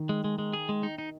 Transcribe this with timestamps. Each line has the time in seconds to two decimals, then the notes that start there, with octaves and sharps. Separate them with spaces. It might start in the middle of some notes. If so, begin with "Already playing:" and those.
Already playing: D#3
0.09 G#3
0.24 G#3
0.39 G#3
0.53 G#4
0.69 G#3
0.83 D#4
0.98 D#4